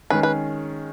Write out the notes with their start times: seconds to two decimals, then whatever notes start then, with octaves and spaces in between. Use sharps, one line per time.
0.10 D#3 G#3 C#4 G#4 B4
0.23 B4